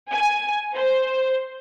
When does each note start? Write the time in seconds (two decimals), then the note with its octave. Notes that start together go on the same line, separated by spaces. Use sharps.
0.13 G#5
0.77 C5